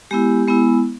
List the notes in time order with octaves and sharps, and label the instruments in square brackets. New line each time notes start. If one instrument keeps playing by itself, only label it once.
[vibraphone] G#3 B3 E4 G4
G#3 B3 E4